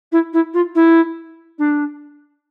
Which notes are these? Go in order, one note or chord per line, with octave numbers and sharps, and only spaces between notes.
E4
E4
F4
E4
D4